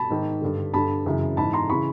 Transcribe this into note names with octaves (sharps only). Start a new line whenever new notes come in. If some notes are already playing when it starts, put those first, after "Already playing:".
Already playing: A5 B5
G#2 D#3
G2 D3
G2 D3 A5 B5
F#2 C#3 E3
G#2 E3 A5 B5
A#5 C6
C#3 E3 B5 C#6